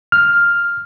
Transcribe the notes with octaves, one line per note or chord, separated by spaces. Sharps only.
F6